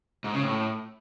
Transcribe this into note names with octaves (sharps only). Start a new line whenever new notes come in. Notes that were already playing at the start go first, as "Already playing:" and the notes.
G#2
C#3
A2